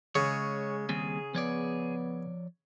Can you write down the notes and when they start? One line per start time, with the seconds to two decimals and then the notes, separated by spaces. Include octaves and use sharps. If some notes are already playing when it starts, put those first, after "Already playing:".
0.15 C#3 G#3 C#5
0.89 D#2 G3 C4 G#4
1.35 F3 B3 C#5 D5